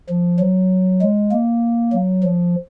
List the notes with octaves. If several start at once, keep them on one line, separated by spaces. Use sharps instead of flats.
F3
F#3
G#3
A#3
F#3
F3